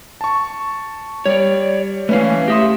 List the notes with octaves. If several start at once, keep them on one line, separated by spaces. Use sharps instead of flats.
A5 C#6
G3 C#5 D5
E3 A3 C#4 B4 F5
G4 E5 C6 D#6 A#6